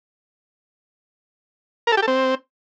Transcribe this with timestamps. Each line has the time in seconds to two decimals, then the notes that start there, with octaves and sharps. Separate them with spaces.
1.87 A#4
1.92 A4
1.97 G4
2.02 A4
2.08 C4